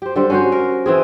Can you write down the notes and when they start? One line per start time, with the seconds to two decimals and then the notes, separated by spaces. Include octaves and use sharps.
0.02 G4 C5
0.16 D3 G3 C5
0.30 C#4 F#4 C5
0.52 A#4
0.86 E3 C4 G#4